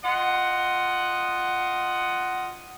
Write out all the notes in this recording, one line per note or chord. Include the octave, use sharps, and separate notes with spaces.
F4 D#5 F#5